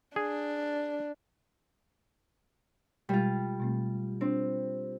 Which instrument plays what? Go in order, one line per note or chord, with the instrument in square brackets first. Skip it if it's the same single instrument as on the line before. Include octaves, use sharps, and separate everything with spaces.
[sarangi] D4 [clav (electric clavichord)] G#4
[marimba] B2 G#3 [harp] G3 F4
[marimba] B2 A3 C4
[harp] C4 [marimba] D4